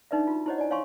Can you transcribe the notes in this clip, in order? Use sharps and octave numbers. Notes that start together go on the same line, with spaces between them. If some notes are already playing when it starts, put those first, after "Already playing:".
D4 D#4 B4 D5 E5
F4 F#4 A#5
E4 G4 C5 C#5 D#5 F#5
D5 G#5
C#5 F5 G#5 C6 C#6